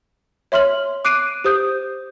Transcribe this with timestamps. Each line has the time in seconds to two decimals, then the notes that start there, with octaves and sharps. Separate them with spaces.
0.52 C#5 E5 C6 F6 F#7
1.05 D6 F#6 C7 D7 D#7
1.44 G4 C5 D#6 G6